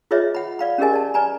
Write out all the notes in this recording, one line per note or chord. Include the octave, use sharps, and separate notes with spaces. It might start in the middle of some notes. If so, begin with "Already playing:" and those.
F4 G#4 B4 C#5 D#5 E5
F#5 B5
D5 F5 B5
C#4 G4 G#4 A#4 D#5 G#5
D5 A5
B4 D5 G#5 A#5 B5